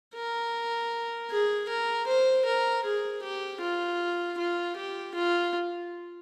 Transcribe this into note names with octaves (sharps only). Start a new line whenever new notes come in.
A#4
G#4
A#4
C5
A#4
G#4
G4
F4
F4
G4
F4